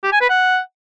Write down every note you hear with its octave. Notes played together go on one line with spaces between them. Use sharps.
G4
G#5
B4
F#5